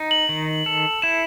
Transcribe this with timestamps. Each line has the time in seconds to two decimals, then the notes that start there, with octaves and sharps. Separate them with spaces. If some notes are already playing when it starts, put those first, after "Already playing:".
Already playing: D#4
0.11 F#7
0.29 D#3
0.66 A4
1.02 E4 E7